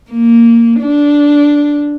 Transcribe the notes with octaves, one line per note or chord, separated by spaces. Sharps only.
A#3
D4